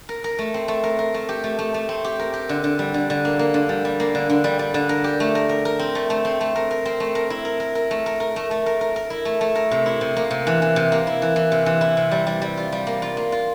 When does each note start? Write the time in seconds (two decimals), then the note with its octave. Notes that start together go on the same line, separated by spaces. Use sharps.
0.09 A#4
0.24 A#4
0.39 A3
0.54 C4
0.68 A3
0.84 A#4
0.99 A#4
1.14 A3
1.29 G4
1.44 A3
1.59 A3
1.74 A3
1.89 C4
2.04 G4
2.19 A#4
2.33 G4
2.49 D3
2.64 D3
2.79 G3
2.94 D3
3.10 D3
3.25 A#3
3.39 A#3
3.54 D3
3.69 G3
3.85 G3
4.00 A#3
4.15 D3
4.30 D3
4.44 G3
4.59 G3
4.74 D3
4.89 A#4
5.04 G4
5.20 A3
5.35 A#4
5.49 A#4
5.65 A#4
5.79 C4
5.95 A3
6.10 A3
6.25 C4
6.41 A3
6.56 A#4
6.71 A#4
6.85 C4
7.00 A3
7.15 A#4
7.30 E4
7.45 A#4
7.60 A#4
7.75 A#4
7.91 A3
8.06 A#4
8.20 A#4
8.36 A3
8.51 A3
8.66 A#4
8.81 A#4
8.96 A#4
9.10 E4
9.25 A3
9.41 A3
9.55 A#4
9.71 C3
9.86 E4
10.01 C3
10.16 A#3
10.31 C3
10.47 E3
10.62 E3
10.76 C3
10.92 A#3
11.07 E4
11.22 E3
11.36 E3
11.52 C3
11.66 E3
11.81 E4
11.97 C3
12.11 G3
12.27 G3
12.42 G3
12.57 F4
12.72 G3
12.87 A#3
13.02 F4
13.17 A#3
13.32 F4